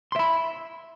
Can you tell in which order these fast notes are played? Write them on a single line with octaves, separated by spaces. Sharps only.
C6 E5 B5